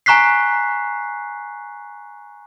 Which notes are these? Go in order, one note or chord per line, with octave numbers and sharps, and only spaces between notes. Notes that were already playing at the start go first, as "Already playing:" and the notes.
G#5 A#5 C#6 F#6 B6 C7